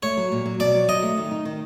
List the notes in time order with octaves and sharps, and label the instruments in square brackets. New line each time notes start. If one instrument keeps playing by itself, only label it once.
[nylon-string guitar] A3 [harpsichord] C#5
[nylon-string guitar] F#3
A#2
F#3
[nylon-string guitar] B2 [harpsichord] D5
[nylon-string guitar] F#3
[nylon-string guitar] F#3 [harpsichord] D#5
[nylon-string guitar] A3
D#3
D#4
D#3